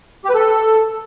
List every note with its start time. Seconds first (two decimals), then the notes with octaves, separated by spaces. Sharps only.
0.24 G4
0.29 B4
0.35 A4